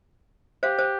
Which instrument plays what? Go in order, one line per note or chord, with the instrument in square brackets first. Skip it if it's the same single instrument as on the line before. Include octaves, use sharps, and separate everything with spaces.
[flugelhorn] G4 [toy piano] C5 F5
[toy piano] C5